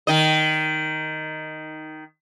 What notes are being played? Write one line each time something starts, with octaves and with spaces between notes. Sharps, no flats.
D#3 D#5